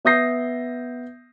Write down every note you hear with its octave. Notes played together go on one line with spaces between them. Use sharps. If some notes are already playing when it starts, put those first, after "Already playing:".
B3 E5 D#6 G6 A#6 C7